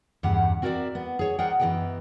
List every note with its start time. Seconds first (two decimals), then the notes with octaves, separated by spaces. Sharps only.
0.23 E2 G2 C#3 G4 F#5
0.62 C4 F#4 A#4 C#5 D5 E5
0.95 B3
1.19 G#4 C#5
1.39 A#4 C5 D5 D#5 F#5 G5
1.60 F#2 E3 B3 G#4 D#5 G5